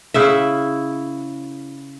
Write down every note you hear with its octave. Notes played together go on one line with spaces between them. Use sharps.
C#3 E4 E5